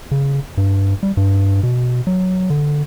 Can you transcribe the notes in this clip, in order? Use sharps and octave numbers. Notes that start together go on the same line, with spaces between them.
C#3
G2
G3
G2
B2
F#3
D3